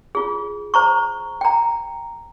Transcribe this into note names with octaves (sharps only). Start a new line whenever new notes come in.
F4 G#4
C5 A#5 C#6
G5 A#5